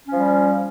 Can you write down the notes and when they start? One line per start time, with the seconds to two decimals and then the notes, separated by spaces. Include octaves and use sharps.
0.07 C#4
0.11 F3
0.16 G3